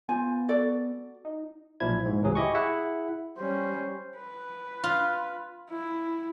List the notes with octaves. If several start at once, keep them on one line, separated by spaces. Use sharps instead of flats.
B3 F4 C5 G#5
F#4 A4 D5
D#4
B1 A#2 F3 E4 G#6
G#2
G#1 C#2 A2 E3 F#3 G#4
E4 G4 D#5 G#5 C#6
E4 G#4 E5 F#5
G3 C#4 C5
B4
F4
E4